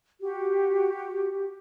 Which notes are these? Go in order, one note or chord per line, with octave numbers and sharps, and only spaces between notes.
F#4 G4